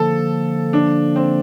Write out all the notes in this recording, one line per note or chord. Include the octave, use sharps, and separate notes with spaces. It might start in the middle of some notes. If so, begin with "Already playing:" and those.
Already playing: D3 F3 A#3 A4
D4
C4